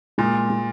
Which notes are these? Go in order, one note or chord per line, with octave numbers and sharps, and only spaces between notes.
A#2 G#3
G#3